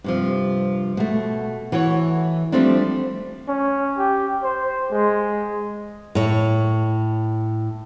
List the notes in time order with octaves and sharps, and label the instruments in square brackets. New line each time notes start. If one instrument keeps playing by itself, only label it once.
[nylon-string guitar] G2 C3 F3
B2 A3
E3 F#4 A4 C#5
F3 G3 A3 C4 D4
[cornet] C#4
G4
C5
G#3
[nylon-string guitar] A2 C#5